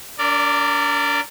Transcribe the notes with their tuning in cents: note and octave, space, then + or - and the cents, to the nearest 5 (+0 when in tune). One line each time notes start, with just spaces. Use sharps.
D4 -40 A#4 -25 D5 +0